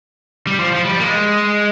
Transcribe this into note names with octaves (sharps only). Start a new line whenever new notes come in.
G3
F3
F3
G3
A#3
G#3